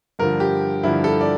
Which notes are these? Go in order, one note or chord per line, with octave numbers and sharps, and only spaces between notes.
G2 D3 F3 A#4
G4
G2 D3 F3 E4
A4
D5